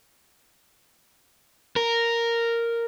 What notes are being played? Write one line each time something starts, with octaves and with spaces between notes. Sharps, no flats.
A#4